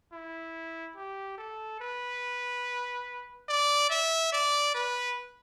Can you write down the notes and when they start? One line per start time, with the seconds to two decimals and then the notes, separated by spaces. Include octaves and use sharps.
0.12 E4
0.96 G4
1.38 A4
1.81 B4
3.49 D5
3.90 E5
4.32 D5
4.75 B4